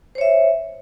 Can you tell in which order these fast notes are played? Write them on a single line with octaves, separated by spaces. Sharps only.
C5 C#5 E5